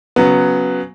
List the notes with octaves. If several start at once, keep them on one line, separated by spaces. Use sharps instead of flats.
C#3 F#3 B3